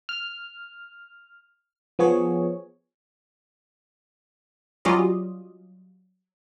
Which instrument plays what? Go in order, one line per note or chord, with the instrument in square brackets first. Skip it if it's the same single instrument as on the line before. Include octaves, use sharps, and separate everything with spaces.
[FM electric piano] F6
F3 B3 G#4 C#5
[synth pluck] F#3 G3 C#4 F4 D5 D#5